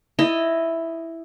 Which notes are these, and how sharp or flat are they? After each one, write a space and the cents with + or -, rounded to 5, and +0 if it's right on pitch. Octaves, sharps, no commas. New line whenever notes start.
E4 +0 D#5 +0 A5 +40